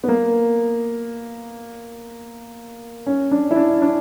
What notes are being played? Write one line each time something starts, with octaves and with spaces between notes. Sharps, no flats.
B3
A#3
C#4
D4
E4
D4
D4